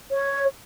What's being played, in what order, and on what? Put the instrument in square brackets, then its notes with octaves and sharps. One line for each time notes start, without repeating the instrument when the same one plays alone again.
[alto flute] C#5